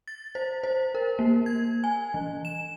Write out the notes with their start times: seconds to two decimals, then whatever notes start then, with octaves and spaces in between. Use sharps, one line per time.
0.08 A6
0.35 C5
0.64 C5
0.95 A#4
1.19 A#3
1.46 G#6
1.84 G#5
2.14 E3
2.45 E7